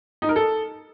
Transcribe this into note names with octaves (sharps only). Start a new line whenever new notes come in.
D#4
A#4
A4